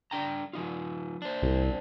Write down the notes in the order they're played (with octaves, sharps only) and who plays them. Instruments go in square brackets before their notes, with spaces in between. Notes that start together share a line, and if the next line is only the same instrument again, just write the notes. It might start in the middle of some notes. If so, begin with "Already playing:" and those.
[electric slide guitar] D4 G5 A#5
F3 D#4 F4
D4 C5
[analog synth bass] C2